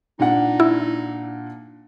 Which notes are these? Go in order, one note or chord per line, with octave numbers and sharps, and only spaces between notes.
A#2 D4 D#4 F#5
E4